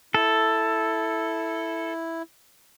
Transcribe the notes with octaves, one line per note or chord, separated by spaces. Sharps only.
E4 A4